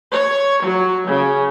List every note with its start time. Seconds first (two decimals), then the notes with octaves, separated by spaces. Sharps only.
0.13 C#5
0.65 F#3
1.09 C#3